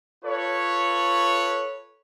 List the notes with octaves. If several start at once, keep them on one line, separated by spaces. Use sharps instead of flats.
F4 A4 B4 C#5